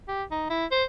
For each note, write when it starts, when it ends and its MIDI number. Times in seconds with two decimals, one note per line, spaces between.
0.08 0.23 67
0.31 0.45 63
0.50 0.66 64
0.71 0.84 72